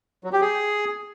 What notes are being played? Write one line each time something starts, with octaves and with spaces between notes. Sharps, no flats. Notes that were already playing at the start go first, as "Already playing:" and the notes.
F#3
G4
G#4